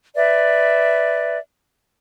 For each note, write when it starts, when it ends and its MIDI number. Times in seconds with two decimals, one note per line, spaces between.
0.15 1.38 71
0.15 1.38 74
0.15 1.38 76